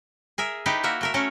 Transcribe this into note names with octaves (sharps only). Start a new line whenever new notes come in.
G#4 A#4 E5
D#4 E4 G4 B4
A#3 F#4 A#4 E5
A3 A#4 E5
A3 C#4 A#4 C#5